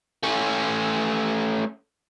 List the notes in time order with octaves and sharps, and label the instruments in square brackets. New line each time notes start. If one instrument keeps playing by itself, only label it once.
[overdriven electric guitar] A3 C#4